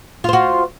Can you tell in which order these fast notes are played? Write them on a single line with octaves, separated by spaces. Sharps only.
F4 C5 F#4